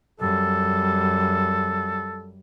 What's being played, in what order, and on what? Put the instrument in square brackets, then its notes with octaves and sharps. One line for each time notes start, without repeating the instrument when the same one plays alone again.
[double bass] F#2 G3 [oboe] A4